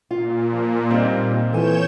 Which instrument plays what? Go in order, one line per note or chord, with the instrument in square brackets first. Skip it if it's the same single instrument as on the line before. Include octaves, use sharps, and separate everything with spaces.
[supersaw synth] A#2 [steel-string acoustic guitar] F4
[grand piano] F3
[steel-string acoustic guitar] G3 D#4 [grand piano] C4 F4
[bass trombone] E3 [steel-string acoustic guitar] A4 G#5 [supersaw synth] C#5 G6 E7